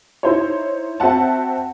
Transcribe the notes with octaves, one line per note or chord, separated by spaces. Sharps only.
D#4 E4 C5 C#5
C4 F#4 E5 F#5 A5